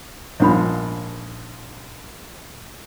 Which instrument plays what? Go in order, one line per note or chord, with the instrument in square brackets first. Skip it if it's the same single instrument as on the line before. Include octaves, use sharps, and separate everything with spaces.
[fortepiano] A#1 G#2 F3 [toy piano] C#5 F#5 B5